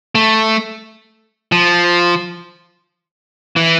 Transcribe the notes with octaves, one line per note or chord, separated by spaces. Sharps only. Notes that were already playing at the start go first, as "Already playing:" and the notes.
A3
F3
E3